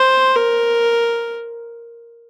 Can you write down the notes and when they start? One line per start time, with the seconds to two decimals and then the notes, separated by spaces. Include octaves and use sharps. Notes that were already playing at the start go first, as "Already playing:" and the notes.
Already playing: C5
0.36 A#4